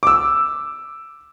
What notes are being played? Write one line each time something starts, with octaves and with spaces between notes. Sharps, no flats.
D6 E6